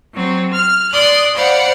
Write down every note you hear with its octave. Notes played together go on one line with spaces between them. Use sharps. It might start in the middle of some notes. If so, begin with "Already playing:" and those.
F#3 C4
F6
D5 C6 D#6 F#6
C5 D5 F5 F#5 B5